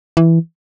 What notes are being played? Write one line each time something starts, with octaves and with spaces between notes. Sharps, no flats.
E3